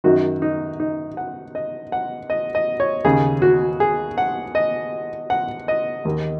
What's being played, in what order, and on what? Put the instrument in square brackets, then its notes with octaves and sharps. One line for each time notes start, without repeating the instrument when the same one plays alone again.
[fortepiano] F#2 D#3 F#4
D#4
D#4
F#5
D#5
F#5
D#5
D#5
C#5
D#2 C#3 G#4
F#4
G#4
F#5
D#5
F#5
D#5
D#2 D#3